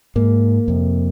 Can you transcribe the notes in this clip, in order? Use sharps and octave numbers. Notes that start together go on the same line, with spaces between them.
G#2 A#3
F2 C3